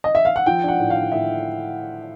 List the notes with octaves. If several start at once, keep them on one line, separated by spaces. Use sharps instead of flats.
D#5
E5
F5
F#5
F3 G5
D4 F#5
A2
F5
D4
A2 E5